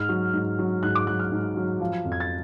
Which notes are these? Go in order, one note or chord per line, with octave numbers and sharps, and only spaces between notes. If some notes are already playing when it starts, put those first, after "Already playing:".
Already playing: G#2 F6
F#3
G#2
F#3
G#2 F#6
D6
F#3 F#6
F6
G#2
F#3
F3
F2
G#6
A6